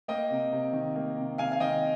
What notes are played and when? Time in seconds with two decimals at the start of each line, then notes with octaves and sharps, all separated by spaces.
0.08 A#3 D#5 G5
0.30 C3
0.53 C3
0.73 D#3
0.95 A#3
1.18 C3
1.38 C3 F5 G#5
1.52 F5
1.60 D#3 D#5 G5